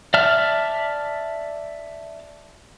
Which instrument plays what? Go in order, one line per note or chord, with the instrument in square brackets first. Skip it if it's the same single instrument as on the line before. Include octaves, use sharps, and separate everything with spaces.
[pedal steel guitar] D5 E5 A5 F6